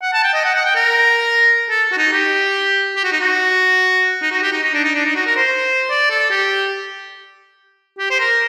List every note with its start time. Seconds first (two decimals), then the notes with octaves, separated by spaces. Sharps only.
0.03 F#5
0.13 A5
0.24 G5
0.34 D#5
0.45 F#5
0.55 F#5
0.66 G5
0.76 A#4
1.70 A4
1.92 F#4
1.98 D#4
2.13 G4
2.96 G4
3.04 F#4
3.12 D#4
3.21 F#4
4.22 D#4
4.32 F#4
4.43 G4
4.53 D#4
4.63 D#4
4.74 D4
4.84 D#4
4.95 D4
5.05 D#4
5.16 F#4
5.26 A#4
5.37 C5
5.90 D5
6.11 A4
6.31 G4
7.99 G4
8.11 C5
8.20 A#4